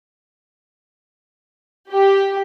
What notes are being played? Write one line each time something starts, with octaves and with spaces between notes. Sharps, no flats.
G4